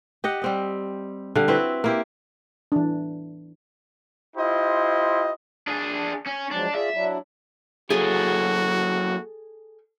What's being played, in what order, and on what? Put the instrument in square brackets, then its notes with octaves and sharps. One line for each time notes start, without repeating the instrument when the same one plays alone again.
[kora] G4 D#5 F#5
G3 C4 D#5
D3 G3 F5
C4 E4 F#4 B4
A#3 E4 G4
[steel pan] E3 D4
[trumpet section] E4 F4 G4 C5 D#5
[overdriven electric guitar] D4 G#4
C#4
[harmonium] F3 F#3 G#3 [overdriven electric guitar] D4
[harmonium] F4 G#4 D5 [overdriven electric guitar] E5
[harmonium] F#3 D4 E4
[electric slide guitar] F#3 A#3 E4 [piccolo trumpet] F#4 [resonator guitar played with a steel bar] G#4 A4